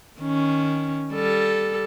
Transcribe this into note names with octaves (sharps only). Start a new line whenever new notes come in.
D#3 C#4
G3 A4